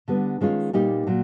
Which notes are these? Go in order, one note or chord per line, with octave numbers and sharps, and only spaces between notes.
D3 G3 B3
D#3 G#3 C#4 F4
A#2 G3 A#3 D#4 G4
A#2 F#3